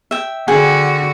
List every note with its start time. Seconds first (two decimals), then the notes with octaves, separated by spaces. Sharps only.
0.11 E5 G5
0.48 D3 F#4 G#4 F#5 G5